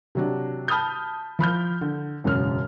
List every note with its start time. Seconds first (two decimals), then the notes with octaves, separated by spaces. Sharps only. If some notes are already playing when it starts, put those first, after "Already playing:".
0.15 C3 F#3 D4
0.68 A5 B5 D#6 F6 G6
1.39 F3 B5 F6 G6
1.81 D3
2.24 E1 F#2 C#3 F6